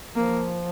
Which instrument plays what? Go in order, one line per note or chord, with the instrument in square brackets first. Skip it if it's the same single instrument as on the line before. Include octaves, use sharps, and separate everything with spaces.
[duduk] F3 [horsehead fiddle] A#3